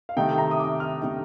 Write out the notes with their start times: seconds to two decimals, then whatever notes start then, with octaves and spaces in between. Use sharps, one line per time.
0.09 F5
0.17 C3 D#3 A3 D#4 G5
0.38 A#5
0.51 D#6
0.59 D6
0.80 F6
1.02 C3 D#3 A3 D#4